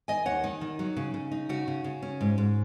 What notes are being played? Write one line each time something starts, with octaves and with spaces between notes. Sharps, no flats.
D#3 D#5 G#5
D#2 C#5 F#5
D#3 D#4
D#3
F#3
C#3
C#3
D#4
C#3 F#4
C#3
C#3
C#4
G#2
G#2